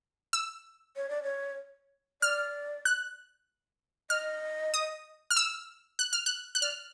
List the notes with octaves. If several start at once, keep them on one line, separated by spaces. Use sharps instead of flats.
E6
C#5
D5
C#5
D5 F6
F#6
D#5 F6
D#6
F6
E6
F#6
F6
F#6
F#6
D5 F6